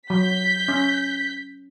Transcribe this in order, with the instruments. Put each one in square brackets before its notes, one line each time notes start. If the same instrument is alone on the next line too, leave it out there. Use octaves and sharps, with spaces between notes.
[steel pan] F#3 [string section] G6 B6
[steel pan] C#4